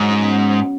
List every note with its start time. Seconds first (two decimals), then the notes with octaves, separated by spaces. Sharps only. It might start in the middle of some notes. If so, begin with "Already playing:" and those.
Already playing: G#2 F#3
0.09 C#4
0.22 B3